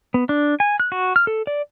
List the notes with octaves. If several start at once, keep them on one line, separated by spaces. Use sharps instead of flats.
B3
D4
G#5
F#6
F#4
F6
A4
D5